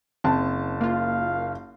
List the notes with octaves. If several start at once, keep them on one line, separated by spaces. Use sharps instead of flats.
F#1 C4 A5
A#3 F4 F5